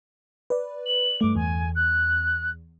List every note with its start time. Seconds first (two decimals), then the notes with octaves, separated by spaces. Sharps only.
0.50 B4 D5
0.85 F#7
1.21 G2 A3 D6
1.36 E2 G#5
1.75 F#6